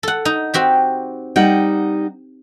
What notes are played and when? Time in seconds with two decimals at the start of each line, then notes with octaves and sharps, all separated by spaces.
0.03 A4 F#5
0.25 D#4
0.54 C4 F#4 G4
1.36 G3 D#4 F#5 G5